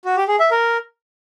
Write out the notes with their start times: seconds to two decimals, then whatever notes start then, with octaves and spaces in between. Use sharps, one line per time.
0.05 F#4
0.17 G4
0.28 G#4
0.40 E5
0.51 A#4